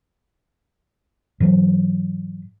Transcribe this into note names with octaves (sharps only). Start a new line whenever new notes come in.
G#2 E3 F#3